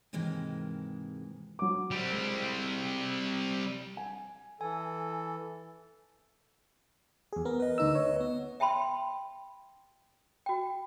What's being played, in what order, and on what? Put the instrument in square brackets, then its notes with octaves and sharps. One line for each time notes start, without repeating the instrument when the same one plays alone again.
[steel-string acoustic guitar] G#2 C3 D#3 E3 G#3 A#3
[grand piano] F#3 D6
[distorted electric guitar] G3 C4
[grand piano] G#3
G#5
[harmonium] E3 A4 [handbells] G#5
[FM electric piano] E2 G#4
B3 A#4
[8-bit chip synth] B4 D#5
[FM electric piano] D2 D#4 E6
C#5
[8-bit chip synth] B3
[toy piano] E5 G5 A5 B5 C6
F#4 G5